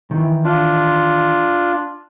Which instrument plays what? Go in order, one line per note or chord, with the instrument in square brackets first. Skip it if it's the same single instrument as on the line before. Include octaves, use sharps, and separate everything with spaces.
[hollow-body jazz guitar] D#3 E3
[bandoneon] D4 F4